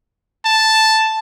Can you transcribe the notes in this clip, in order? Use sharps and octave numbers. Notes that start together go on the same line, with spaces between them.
A5